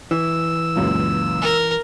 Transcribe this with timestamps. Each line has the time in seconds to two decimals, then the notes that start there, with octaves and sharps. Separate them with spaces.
0.11 E3 E6
0.75 C#2 F#2 A#2
1.42 A#4